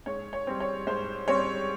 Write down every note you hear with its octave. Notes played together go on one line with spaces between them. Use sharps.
G#2 C#5
C#5
G3 C4
C#5
G#2 C5
G3 C4 C#5